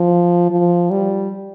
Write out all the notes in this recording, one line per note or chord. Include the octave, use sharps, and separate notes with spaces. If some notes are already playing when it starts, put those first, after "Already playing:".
Already playing: F3
F3
G3